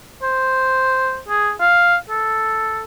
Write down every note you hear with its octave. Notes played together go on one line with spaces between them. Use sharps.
C5
G#4
F5
A4